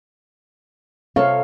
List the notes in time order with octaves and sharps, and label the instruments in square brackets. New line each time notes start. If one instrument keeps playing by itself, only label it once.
[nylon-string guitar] C3 A4 C#5 [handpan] F5